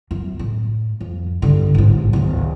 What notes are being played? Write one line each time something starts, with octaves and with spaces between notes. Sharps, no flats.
F#2
A2
F2
G2 D3
A1 G#2
D1 D#2